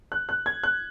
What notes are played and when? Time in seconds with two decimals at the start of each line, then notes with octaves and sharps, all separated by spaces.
0.12 F#6
0.29 F#6
0.46 G#6
0.64 F#6